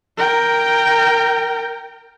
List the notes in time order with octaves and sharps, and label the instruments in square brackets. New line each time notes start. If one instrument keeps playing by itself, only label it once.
[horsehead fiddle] A#4 G5